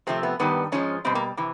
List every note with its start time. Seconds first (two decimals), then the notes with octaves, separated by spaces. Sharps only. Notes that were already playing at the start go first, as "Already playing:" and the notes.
0.07 C3 F3 A3 C4
0.23 B3
0.40 G2 D#3 G3 B3
0.72 G#2 F3 G#3 C#4
1.05 B2 G3 C4
1.15 A#3
1.37 C3 E3